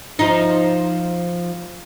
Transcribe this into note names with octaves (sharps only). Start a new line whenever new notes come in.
F3 D#4